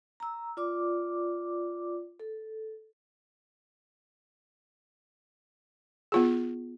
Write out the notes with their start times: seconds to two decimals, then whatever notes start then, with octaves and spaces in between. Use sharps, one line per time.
0.20 A#5 E6
0.57 F4 D5 D6
2.20 A4
6.12 B3 F4 G#4